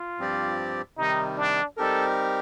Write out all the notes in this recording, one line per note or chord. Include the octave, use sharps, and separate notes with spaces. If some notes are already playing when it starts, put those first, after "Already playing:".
Already playing: F4
G2 F3 C4 G4 D5
C3 D#3 G3 D#4
D4
G3 C4 D#4 G4 A4 A#4